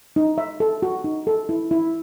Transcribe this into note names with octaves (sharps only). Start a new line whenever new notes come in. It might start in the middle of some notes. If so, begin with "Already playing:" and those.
D#4
E5
A4
F#4
D#4
A4
E4
E4